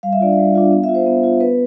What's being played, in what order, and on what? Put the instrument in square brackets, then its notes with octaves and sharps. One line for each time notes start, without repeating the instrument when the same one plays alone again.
[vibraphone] G3 F5
E5
D4 F4 D5
E5
G3
D4 F4
B3 F5
E5
F4
C5
B3
F4
B3 B4